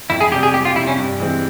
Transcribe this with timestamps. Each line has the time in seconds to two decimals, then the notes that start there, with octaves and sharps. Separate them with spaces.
0.09 F2 E4
0.21 G#4
0.31 C3 G4
0.35 G3
0.43 G#4
0.54 F2 G4
0.65 F4
0.76 C3 G3 E4
0.87 C#4
0.99 G2
1.20 E3 G#3 C4